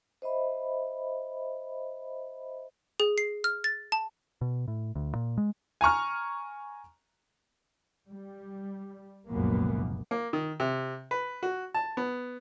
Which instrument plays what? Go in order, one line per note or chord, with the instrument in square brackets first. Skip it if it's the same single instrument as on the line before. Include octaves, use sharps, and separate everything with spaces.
[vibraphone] C5 D#5 E5 B5
[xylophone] G#4
C7
F6
A6
A5
[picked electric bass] B2
A2
D2
A#2
G#3
[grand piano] G#5 A#5 C#6 F6
[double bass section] G3
F1 C#2 F#2 A#2 A#3 B3
[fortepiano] A#3
D#3
C3
B4
F#4
A5
B3